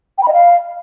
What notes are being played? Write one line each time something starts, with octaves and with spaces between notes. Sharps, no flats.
G5
B5
D#5
F5